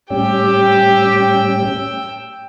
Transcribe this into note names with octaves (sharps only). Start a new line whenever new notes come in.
A2 G3 C#4 G4 G5 E6